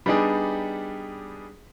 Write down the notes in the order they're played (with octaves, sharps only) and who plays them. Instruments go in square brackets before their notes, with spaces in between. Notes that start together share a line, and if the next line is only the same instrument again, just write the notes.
[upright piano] G3 B3 D4 D#4 G4 G#4